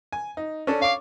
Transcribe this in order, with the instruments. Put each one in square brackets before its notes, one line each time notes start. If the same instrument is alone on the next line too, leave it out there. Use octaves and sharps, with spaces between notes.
[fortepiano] G#5
D#4
C#4 D4 A4
[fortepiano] C#5 D6 [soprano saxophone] F5